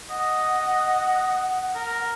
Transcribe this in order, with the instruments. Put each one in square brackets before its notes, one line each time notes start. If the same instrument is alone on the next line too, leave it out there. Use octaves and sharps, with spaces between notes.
[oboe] D#5 [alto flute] F#5
[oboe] A#4